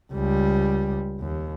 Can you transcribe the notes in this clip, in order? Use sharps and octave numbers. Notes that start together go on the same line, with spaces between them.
C#2 G3
D#2